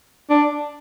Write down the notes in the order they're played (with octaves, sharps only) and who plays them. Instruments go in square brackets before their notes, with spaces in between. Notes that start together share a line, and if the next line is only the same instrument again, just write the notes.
[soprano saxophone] D4